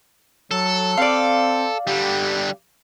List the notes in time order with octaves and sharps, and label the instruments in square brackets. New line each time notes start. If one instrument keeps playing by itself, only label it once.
[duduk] F#3 [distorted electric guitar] A4
[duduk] C4 [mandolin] D5 F5
[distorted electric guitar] D3 G3 [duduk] G4